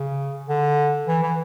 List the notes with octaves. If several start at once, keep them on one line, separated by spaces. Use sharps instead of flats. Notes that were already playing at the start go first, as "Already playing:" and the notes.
Already playing: C#3
D3
E3
E3